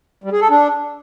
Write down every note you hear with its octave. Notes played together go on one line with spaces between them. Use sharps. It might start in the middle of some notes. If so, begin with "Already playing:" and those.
G3
G#4
A4
D4